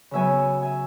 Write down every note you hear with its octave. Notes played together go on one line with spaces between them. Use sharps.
C#3 F#3 B3 E5 G#5
E5 G#5